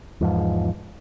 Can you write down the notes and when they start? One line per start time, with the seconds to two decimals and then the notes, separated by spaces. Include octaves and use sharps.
0.21 E2 G#2 F3